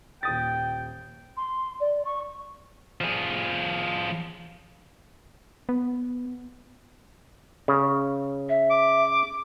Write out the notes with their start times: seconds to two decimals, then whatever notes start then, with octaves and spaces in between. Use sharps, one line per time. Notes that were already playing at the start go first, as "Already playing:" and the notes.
0.23 D#1 G5 D#6 A6
1.37 C6
1.80 D5
2.05 C#6
3.01 F3 G#4
5.69 B3
7.68 C#3
8.49 E5
8.71 D6